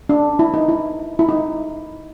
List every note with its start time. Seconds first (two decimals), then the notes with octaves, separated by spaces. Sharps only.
0.09 D4
0.39 E4
0.54 D#4
0.69 E4
1.19 E4
1.29 D#4